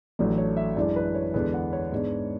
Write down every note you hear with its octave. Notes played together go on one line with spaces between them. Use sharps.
A1 A2 F#3 A3 D4 D5
C#5
E5
F#2 E3 G#3 D4 D5
B4
C#5
E2 D3 G#3 B3 D4 B4
F#5
C#5
G#2 G#3 B3 D4